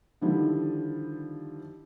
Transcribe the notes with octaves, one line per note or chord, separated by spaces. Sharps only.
D3 D#3 F3 G3 E4